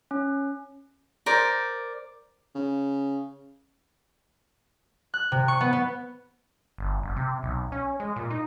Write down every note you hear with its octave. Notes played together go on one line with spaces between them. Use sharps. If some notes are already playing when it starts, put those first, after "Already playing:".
C#4
A#4 C5 D5
C#3
F#6
C3
C#6
B3
B3
G1
F#1
C3
B1
C#4
G#3
A#2
D#4